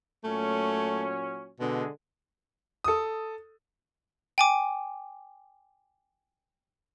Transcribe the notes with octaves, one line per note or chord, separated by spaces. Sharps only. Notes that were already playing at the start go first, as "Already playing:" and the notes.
A#2 F#3 A3 C#4
B2 D3 G#3
A4 D#6
G5 G#5 D6